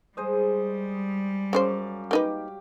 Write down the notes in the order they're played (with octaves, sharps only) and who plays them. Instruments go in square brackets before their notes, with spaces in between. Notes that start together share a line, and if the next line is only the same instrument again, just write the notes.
[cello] G3 [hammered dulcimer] G#3 C5 D#5
[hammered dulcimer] F#2 F5 D6 [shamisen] C#3 C4 C5
[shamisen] A#3 D#4 B4 [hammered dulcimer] G4